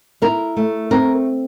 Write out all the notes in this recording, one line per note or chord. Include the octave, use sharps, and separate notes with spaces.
E4 A#4
A3
C4 A#4